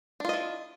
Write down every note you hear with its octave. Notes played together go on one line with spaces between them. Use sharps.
D4 E4 F4 D#5